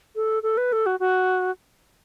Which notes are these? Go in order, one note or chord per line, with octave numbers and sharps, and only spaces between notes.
A4
A4
B4
A4
F#4
F#4